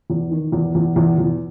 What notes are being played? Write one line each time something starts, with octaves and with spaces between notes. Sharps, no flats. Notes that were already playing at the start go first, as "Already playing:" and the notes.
E2
D#3
E2
E2
E2
E2